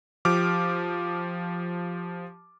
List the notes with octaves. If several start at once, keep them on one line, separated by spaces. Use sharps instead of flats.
F3 G4 D6 F6